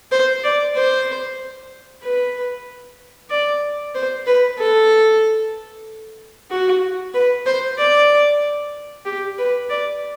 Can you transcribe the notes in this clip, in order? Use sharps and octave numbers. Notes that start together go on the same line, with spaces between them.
C5
D5
C5
B4
D5
C5
B4
A4
F#4
B4
C5
D5
G4
B4
D5